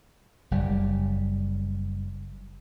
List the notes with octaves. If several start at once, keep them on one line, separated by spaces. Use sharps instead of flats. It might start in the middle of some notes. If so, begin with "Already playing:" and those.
F#1 G3